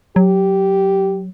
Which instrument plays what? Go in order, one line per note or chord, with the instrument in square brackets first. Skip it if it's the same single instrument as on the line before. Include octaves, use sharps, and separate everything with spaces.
[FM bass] F#3 [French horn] G4